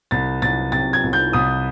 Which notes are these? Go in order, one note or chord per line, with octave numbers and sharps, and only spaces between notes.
C2 A6
C2 A6
C3 A6
G#6
C2
G6
C2 D#6